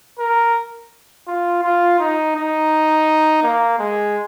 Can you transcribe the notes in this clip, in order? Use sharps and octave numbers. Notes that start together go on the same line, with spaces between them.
A#4
F4
F4
D#4
D#4
A#3
G#3